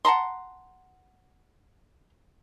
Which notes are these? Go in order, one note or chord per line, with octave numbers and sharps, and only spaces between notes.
F#5 A5 A#5 C6